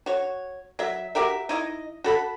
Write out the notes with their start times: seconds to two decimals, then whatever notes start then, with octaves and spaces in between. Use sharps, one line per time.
0.06 F#4 C#5
0.79 F#3 E5
1.15 F#4 G4 A#4 E5
1.49 D#4 E4 D#5
2.04 F#4 A4 B5